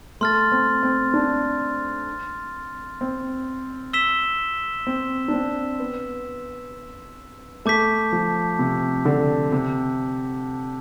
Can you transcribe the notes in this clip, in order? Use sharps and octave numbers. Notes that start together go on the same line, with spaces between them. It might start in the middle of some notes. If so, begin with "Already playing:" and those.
A3 C6 F6 A6
C4
C4
D4
C4
E6 B6 E7 G7
C4
D4
C4
B3
A3 A5 D6 G6 B6
F3
C3
D3
C3